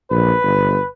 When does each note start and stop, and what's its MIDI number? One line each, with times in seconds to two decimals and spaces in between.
0.11 0.33 34
0.11 0.89 71
0.43 0.77 31